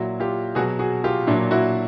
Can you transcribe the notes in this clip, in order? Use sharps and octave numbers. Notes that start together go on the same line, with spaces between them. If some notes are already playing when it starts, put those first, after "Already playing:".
Already playing: A#2 F#3 E4 F#4
F4 G4
B2 F#3 F#4 G#4
F#4 G#4
F4 G4
A#2 F#3 D4 E4
E4 F#4